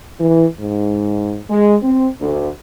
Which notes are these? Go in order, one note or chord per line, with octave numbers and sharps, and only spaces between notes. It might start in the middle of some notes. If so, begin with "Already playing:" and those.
E3
G#2
G#3
C4
D2